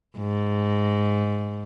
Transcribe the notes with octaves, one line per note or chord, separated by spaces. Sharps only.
G#2